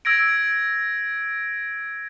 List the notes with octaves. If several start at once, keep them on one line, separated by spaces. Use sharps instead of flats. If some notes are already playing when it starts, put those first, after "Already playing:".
E6 G#6 A#6 D7